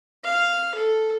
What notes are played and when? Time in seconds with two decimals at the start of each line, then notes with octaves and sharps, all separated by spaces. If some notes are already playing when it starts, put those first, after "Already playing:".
0.24 F5
0.75 A4